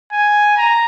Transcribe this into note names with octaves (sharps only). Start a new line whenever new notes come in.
G#5
A#5